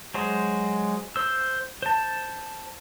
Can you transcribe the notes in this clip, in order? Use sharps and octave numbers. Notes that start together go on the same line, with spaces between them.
F#3 G#3 C5
C5 E6
C5 A5